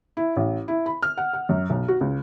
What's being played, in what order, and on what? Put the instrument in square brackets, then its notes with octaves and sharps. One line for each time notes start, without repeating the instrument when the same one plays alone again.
[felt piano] E4
A1
E4
B5
F6
F#5
F#5
F#2
B1
F#4
C#2